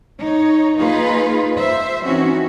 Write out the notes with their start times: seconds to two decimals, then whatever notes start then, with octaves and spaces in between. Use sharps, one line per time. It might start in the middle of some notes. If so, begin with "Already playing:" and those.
0.20 D#4 C#5
0.77 A#3 D#4 F4 G#4 B4
1.56 C5 E5
2.05 E3 C4 C#4 D#4 F#4